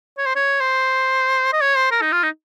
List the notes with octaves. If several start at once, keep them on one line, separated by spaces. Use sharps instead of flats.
C#5
C5
C#5
C5
D#5
C#5
C5
A#4
D#4
F4
D#4